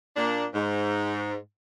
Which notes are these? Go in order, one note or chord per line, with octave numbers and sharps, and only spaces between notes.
A#2 A#3 D4
G#2